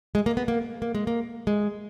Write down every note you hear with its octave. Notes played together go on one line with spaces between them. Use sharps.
G#3
A#3
B3
A#3
A#3
G#3
A#3
G#3